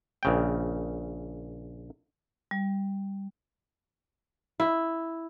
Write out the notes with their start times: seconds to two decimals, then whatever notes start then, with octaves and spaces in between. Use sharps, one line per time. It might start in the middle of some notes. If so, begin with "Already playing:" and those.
0.23 A#1 C#3 G5
2.51 G3
4.60 E4